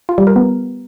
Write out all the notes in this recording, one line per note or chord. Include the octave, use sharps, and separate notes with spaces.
F4
G3
A#4
B3